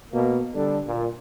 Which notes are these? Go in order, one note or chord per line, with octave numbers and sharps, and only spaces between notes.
B2 A#3
D3 G3 D4 A4
A#2